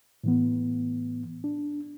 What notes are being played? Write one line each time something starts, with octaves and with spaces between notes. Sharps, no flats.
A2 E3 B3
D4